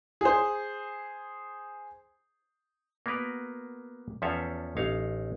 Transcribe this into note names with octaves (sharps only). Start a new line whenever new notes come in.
G#4 C5
A#3 B3 F#4 A#4 B4
E2 F3 C#4 A4 E5 F5
A1 D#4 C#5 F5